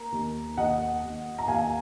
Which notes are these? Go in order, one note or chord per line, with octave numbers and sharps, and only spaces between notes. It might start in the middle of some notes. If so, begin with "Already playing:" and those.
Already playing: A#3 A#5
D#2
D#2 D#5 F#5
D#2
A#5
D#2 F5 G#5